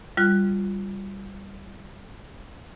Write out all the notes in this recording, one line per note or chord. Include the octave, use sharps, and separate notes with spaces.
G3 F4 F#6